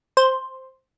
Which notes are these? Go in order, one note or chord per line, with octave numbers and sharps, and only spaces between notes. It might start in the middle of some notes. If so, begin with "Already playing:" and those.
C5